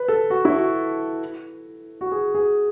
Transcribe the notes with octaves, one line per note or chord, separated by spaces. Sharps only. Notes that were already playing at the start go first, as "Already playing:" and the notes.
Already playing: B4
A4
F#4
E4
F#4
F#4
G#4
G#4